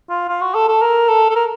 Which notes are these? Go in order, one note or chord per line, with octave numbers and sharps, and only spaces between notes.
F4
F4
F#4
A4
A4
A#4
A4
A4
A#4